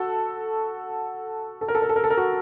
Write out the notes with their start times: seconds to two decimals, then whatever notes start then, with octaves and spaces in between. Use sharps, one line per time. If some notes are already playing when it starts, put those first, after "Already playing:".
Already playing: F#4 A4
1.61 A4
1.68 A#4
1.75 A4
1.82 A#4
1.89 A4
1.96 A#4
2.04 A4
2.10 A#4
2.17 F#4 A4